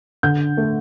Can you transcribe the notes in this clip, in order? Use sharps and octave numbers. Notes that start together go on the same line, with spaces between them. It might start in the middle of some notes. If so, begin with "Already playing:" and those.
D3 G6
A3